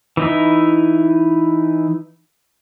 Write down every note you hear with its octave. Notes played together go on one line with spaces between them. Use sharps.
E3 D#4 E4